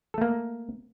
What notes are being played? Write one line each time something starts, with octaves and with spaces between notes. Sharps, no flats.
A3 A#3 A4